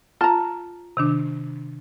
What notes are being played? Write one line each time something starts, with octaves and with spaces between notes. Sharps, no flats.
F4 A5 A#5
C3 D#3 D4